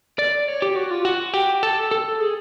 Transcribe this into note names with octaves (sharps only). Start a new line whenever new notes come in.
D5
C#5
G4
F#4
F4
F#4
G4
A4
A4
G#4